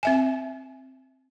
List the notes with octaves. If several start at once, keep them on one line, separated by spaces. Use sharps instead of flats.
C4 E5 G#5